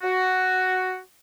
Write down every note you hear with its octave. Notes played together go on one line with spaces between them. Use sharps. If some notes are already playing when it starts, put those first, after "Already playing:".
F#4